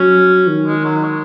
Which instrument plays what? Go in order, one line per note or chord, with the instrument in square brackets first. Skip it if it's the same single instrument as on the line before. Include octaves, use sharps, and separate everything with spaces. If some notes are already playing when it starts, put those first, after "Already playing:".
Already playing: [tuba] F#3 [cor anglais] C#4
[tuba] D#3
[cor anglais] G#3
F#3
G#3